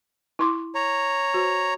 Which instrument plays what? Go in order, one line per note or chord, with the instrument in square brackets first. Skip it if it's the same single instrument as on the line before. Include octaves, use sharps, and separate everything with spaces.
[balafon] E4 C6 D6
[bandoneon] C#5 A#5
[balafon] F#4 C5